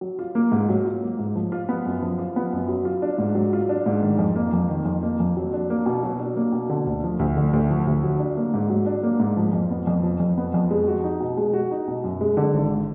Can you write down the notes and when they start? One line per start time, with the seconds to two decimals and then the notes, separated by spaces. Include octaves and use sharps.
0.01 F#3
0.19 F4
0.35 A#3
0.52 G#2
0.69 F#3
0.85 F4
1.02 A#3
1.19 G#2
1.35 F3
1.52 F4
1.69 B3
1.86 F#2
2.02 F3
2.19 F4
2.36 B3
2.53 F#2
2.69 F#3
2.85 F4
3.02 D4
3.18 G#2
3.35 F#3
3.53 F4
3.69 D4
3.86 G#2
4.02 D#3
4.19 F2
4.36 A#3
4.53 F2
4.69 D#3
4.85 F2
5.03 A#3
5.20 F2
5.37 F#3
5.53 D4
5.70 A#3
5.86 B2
6.03 F#3
6.19 D4
6.36 A#3
6.52 B2
6.69 D3
6.86 D2
7.04 F3
7.19 D2
7.37 D3
7.53 D2
7.70 F3
7.87 D2
8.03 F#3
8.19 D4
8.37 A#3
8.54 G#2
8.70 F#3
8.86 D4
9.03 A#3
9.20 G#2
9.37 F3
9.53 F2
9.70 B3
9.87 F2
10.03 F3
10.20 F2
10.38 B3
10.54 F2
10.71 G#3
10.88 F#4
11.04 D#4
11.20 B2
11.37 G#3
11.53 F#4
11.71 D#4
11.87 B2
12.04 F#2
12.21 G#3
12.37 D3
12.54 G#1